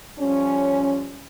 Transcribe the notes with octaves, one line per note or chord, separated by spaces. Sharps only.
F3 G3 C#4